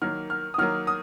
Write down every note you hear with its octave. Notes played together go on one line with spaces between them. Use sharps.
D#3 F#3 A#3 F6
F6
D#6
D#3 F#3 A#3 F6
D#6